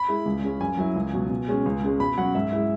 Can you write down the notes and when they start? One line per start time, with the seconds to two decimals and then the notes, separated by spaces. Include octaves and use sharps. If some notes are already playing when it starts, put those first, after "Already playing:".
Already playing: B5
0.08 G#3 E4
0.26 C#2
0.43 C#3 G#3 C#4
0.60 F#2 G#5
0.78 F#3 E4
0.96 C#2
1.13 B2 F#3
1.30 B2
1.48 G#3 C#4
1.66 C#2
1.83 C#3 G#3 C#4
2.00 B2 B5
2.18 F#3 C#4 F#5
2.35 G#2 E5
2.53 G#3 E4